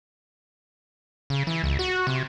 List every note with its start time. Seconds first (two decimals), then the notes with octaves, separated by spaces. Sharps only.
1.30 C#3
1.47 E3
1.64 C#2
1.79 F#4
2.07 C3